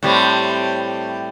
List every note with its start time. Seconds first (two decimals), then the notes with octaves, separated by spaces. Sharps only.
0.03 A2 G3 C4